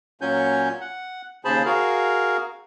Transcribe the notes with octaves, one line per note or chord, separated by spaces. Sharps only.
A#2 F#3 C#4 G#5 G6
F#5
D#2 C#3 G#4 C5 A5 B5
F#4 G#4 A#4 F5